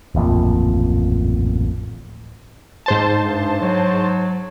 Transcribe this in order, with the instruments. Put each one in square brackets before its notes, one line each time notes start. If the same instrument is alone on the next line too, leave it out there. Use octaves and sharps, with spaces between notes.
[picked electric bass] D1 A1 F2 A#2
[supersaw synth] G#2 C5 A5
[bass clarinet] G2
F#3